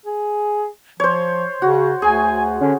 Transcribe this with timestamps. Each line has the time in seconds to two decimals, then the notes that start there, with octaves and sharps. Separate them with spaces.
0.06 G#4
1.00 F3 C5 C#5
1.62 C#3 F#4
2.02 D2 G#4 G#5
2.61 D3 C#4